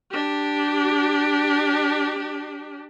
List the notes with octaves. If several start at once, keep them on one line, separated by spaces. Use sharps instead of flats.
D4 G4